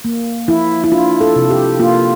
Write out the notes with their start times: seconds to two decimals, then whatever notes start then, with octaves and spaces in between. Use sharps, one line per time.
0.04 A#3
0.48 F3 E4
0.84 E4
0.92 D4 F4
1.21 A4
1.36 C3
1.50 G4
1.79 A#3 F4